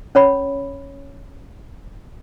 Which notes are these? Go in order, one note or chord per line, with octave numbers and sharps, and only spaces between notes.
C#4 C#5 B5